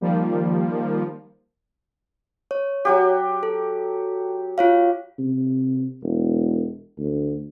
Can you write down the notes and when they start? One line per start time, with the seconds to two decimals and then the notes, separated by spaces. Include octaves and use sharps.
0.01 D#3 F3 G3 A#3
2.51 C#5
2.85 F#3 F#4 G4
3.43 A4
4.58 F4 C#5 F5
5.19 C3
6.03 E1
6.98 D2